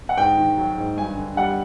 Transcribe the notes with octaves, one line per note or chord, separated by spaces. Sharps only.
F#5
G#2 G5
D#3
F#3
G#2
G2 G#5
D3
G3 F#5